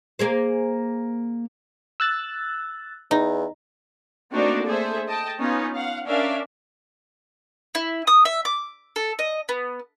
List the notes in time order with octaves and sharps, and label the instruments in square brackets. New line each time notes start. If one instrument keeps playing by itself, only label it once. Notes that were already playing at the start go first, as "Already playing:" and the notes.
[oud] A#3 G#4 C5
[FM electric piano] E6 F#6 A6
[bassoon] E2 [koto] D#4
[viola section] A3 A#3 C4 D4 D#4 F#4
A3 G#4 A4 C5 E5
D#5 G5 A5
B3 C#4 D#4 F4
F5 F#5
C#4 D4 A#4 D5 E5 F5
[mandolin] E4
D#6
E5
D6
A4
D#5
B3